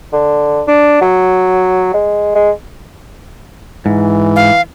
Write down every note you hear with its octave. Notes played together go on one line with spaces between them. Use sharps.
D3
D4
F#3
G#3
G#3
G#2 E3
F5